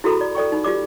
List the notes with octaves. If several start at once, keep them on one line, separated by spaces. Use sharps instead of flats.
E4 F#4 G#4 A4 A#5 B5
D5
A4 D5 G5 C#6
D#4 B5
F4 G4 D5 D6